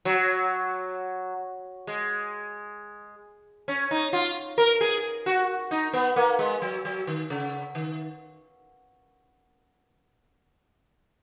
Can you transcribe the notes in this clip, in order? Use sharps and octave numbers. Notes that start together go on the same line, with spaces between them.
F#3
G#3
C#4
D#4
F4
A#4
G#4
F#4
D#4
B3
A#3
G#3
F#3
F#3
D#3
C#3
D#3